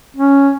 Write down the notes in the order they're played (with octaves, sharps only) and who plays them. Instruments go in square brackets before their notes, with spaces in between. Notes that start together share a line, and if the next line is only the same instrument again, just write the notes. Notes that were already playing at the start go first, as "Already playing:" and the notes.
[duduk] C#4